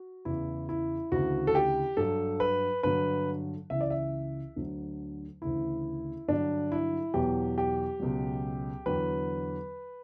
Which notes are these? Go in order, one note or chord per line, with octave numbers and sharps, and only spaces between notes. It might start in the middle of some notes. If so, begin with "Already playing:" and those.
Already playing: F#4
E2 C#3 E3 E4
E4
D2 C#3 E3 F#4
A4
G4
G2 F#3 A4
B4
G2 D3 F#3 B4
C#2 C#3 E3 E5
D5
E5
D2 D3 F#3
D2 C#3 E3 E4
G2 D3 F#3 D4
E4
E2 B2 F#3 G4
G4
C#2 B2 F#3
E2 D3 F#3 B4